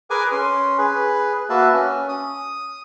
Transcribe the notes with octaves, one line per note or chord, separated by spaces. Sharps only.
G#4 A#4 B4 G#5 D6
C#4 C6
G#4 B4
A#3 F#4 B4 E5 A5
C#4
D#6